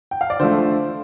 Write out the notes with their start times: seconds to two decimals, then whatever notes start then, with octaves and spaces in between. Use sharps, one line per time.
0.11 G5
0.21 F5
0.30 D5
0.39 D3 F3 A3 C5